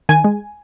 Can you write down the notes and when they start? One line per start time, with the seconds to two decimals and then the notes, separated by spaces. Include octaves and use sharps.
0.09 D#3 G#5
0.24 G#3